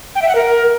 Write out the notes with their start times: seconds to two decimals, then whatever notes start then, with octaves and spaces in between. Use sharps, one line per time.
0.15 G5
0.22 E5
0.29 F#5
0.35 A#4